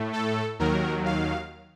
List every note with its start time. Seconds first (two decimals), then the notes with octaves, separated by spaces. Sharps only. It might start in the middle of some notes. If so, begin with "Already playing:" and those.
Already playing: A2 A3
0.13 A4
0.59 D#2 D#3 F#3 A#4
1.05 F5